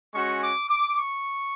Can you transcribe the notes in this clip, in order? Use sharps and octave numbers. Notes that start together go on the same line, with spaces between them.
G#3 C#4 F#4 C#6
D6
D6
C#6